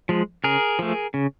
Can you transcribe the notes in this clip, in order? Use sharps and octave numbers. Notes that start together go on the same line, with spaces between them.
F3 G#3
C#3 G#4 A#4
F3 A3
C#3